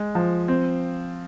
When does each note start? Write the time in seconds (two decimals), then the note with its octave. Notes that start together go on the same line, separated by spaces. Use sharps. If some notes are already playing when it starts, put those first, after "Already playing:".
Already playing: G#3
0.15 F3
0.48 C4